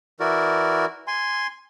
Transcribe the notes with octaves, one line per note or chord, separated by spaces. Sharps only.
E3 E4 F#4 A#4 D5
G#5 C6